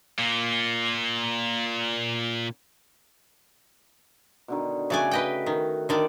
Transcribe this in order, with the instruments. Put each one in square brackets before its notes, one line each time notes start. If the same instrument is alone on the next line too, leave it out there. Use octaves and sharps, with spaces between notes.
[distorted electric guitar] A#2 A#3
[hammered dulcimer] B2 D3 D#3
[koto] C#3 D5 G#5 [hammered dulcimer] A3 F#4
[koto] B4 D#5 G5
D#3
D3 D#3 D5